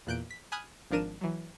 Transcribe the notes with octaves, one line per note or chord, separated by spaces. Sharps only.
E2 A#2 F#6 G6 D7
B6
G#5 B5 D#6 F6 F#6 G#6
G#1 F3 D4 A#4 D#7 E7
E3 F#3